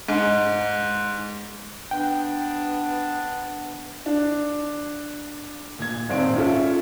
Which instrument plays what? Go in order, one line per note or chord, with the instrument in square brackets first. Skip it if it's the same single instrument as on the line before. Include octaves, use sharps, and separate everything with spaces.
[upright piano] G#2
[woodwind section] B3 D4 [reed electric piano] G5
[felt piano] D4
A#2 G#6
D#1 G#1 C4 D5 D7
C#4 F4 A4 E5